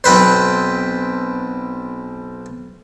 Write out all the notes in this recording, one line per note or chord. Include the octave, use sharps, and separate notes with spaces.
B1 C4 B4 C5